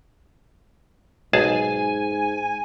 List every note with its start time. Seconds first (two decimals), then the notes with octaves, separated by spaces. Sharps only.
1.33 B1 G#2 G#4 G#5 A5